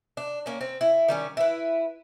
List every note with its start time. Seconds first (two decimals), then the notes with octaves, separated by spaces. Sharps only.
0.17 D4
0.46 A#3 C#4
0.61 C4
0.81 E4
1.08 D#3 G3 C#4
1.37 E4 B4